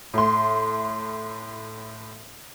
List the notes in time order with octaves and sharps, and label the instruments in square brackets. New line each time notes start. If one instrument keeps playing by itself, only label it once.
[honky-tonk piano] A2 C6